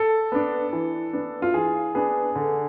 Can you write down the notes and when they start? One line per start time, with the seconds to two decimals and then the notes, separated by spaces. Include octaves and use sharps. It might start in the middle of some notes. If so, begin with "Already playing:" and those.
Already playing: A4
0.32 B3 D4
0.73 E3
1.13 B3 D4
1.42 F4
1.54 E3 G#4
1.95 B3 D4 G#4
2.36 D3